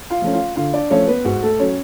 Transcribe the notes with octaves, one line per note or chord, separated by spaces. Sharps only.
F4 F5
F3 A3 C#4
F4 F5
D3 F4 F5
D4 D5
F3 A3 C#4 C#5
B3 B4
G#2 F#4
A3 A4
F#3 C#4 C#5